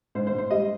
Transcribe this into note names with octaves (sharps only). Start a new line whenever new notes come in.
G#2 C5
C5
G#2
C5
G3 D#5